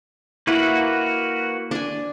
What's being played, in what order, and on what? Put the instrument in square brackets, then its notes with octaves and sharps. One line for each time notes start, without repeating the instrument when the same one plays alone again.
[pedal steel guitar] A#3 F#4 B4 [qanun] E4
[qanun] D4 G#5